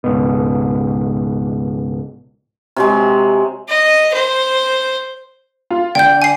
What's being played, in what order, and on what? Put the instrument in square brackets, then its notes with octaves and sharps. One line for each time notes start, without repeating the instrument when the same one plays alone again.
[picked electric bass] C#2 G#2 B2
[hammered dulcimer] C3 F#3 G#3
[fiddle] D#5
C5
[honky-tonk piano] F4
[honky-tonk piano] D3 [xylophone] G5 G6
[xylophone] G#5 C7